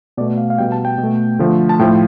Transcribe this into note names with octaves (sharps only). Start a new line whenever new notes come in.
B2 A3 D5
F5
F5
B2 G3 G5
A5
G5
B2
A3
D3 F3 A3
A5
A2 F3 A3 G5